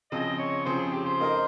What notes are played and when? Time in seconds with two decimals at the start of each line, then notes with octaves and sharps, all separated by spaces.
0.11 C#3 F3 C4 D#5
0.39 C#5
0.65 C#3 F3 C4 C5
0.79 G#4
0.92 G4
1.06 C5
1.20 A#3 D#4 A#4 D#5